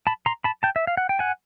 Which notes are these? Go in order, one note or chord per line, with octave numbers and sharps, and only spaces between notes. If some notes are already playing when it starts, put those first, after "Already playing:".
A5 B5
A#5 C6
A5 B5
G5 A5
E5
F5
F#5
G5
F#5 G#5